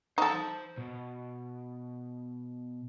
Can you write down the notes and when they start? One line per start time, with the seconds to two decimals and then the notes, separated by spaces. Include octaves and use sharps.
0.18 D#4 A4 C5 A5
0.78 B2